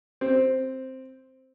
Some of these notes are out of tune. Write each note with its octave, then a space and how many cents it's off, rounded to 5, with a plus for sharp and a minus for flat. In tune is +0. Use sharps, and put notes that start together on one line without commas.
C4 +0